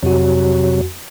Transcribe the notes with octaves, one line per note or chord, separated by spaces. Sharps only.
F2 C3 F#3 F#4